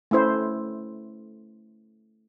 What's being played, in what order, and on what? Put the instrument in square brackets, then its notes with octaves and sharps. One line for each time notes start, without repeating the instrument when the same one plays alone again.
[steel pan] A3 C#4 E4 C5